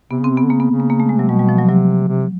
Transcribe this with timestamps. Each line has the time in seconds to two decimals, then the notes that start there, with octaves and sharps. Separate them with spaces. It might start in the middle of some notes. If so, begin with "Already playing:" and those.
0.11 C3 B3
0.20 C#3 C4
0.30 C3
0.38 B3
0.43 D3
0.50 C#3 A#3
0.60 B3
0.70 C#3
0.80 A#3
0.90 A#3
1.00 A3
1.09 G#3
1.18 C3 F#3
1.29 B2 G3
1.39 G3
1.49 F3
1.59 F#3
1.69 C3 F#3
2.08 C3